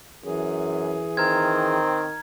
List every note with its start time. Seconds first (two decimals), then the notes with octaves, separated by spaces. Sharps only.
0.24 F#2 E3 G#4
1.17 D#3 C4 A#5 F6 G#6